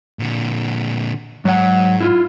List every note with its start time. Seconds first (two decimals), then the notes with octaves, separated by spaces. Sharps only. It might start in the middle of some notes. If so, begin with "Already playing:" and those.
0.19 A#2 D3
1.45 G#2 F#3 F#5
2.01 E4 F4